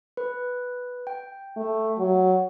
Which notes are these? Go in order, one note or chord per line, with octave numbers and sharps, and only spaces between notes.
B4
G5
A3
F#3